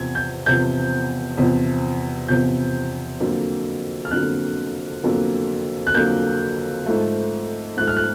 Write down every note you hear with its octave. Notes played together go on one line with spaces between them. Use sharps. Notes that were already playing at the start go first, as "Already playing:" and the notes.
Already playing: E2 C3 F3 G#6
G6
E2 C3 F3 G6
E2 C3 F3
E2 C3 F3 G6
F2 D3 F#3 A#3
F6
F2 D3 F#3 A#3 F#6
F2 D3 F#3 A#3
F#6
F2 D3 F#3 A#3 G6
G#2 F3 A3
G#2 F3 A3 F#6
F6
F#6